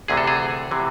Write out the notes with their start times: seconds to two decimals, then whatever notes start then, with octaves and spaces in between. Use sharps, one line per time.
0.08 D2 C3 E3 G#4
0.17 A4
0.27 G#4
0.71 C3 E3